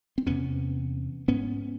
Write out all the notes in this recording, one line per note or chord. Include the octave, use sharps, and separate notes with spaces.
C4
E2 C3 B3 C#4
G#2 B3 C#4